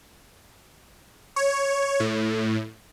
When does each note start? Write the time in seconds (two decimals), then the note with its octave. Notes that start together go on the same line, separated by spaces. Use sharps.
1.36 C#5
2.00 A2